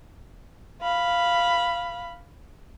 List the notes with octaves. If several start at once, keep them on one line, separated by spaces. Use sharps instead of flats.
F5 B5